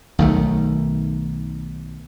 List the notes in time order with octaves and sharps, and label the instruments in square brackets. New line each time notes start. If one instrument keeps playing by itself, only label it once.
[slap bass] B1 D#3 A3